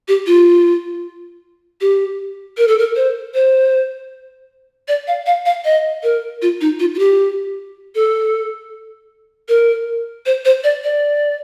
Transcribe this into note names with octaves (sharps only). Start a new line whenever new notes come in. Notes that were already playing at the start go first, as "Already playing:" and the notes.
G4
F4
G4
A#4
A4
A#4
C5
C5
D5
F5
F5
F5
D#5
A#4
F4
D#4
F4
F4
G4
A4
A#4
C5
C5
D5
D5